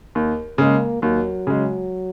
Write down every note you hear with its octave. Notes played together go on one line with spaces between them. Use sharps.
D#2
C#3 G#3 A#3
D#2 F#3
C#3 G#3